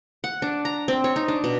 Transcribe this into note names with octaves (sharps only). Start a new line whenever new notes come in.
F#5
D4
A#5
C4
C#5
D#4
D4
B2